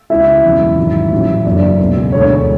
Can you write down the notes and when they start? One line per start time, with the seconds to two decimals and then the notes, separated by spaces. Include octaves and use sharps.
0.10 C#2 C#3 G#3 E4 E5
0.43 E1 E2 C#3 F#3
0.78 G#1 G#2 F#3
1.11 A1 G#2 F#3
1.45 F#1 F#2 D3 F#3 D5
1.79 C#2 B2 G#3
2.12 E1 D2 D3 G#3 C#5